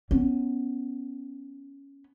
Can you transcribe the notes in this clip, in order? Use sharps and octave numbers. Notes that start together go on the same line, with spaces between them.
B3 C#4